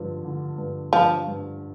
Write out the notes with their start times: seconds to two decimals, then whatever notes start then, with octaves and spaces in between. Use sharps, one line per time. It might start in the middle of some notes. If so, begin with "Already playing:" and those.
Already playing: G2 D3 F3
0.24 D3
0.58 G2
0.92 G2 F3
1.27 G2